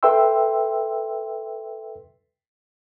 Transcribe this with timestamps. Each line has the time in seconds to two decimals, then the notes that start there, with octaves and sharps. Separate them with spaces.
0.03 A4 B4 E5 G5 C6 E6